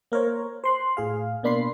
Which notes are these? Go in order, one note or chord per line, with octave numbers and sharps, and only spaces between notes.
A#3 A#4 C5 C#5
C5 C6 F#6
A2 G#4 F5
B2 A#3 D4 B5 C6 C7